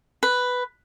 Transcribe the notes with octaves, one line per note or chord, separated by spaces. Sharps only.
B4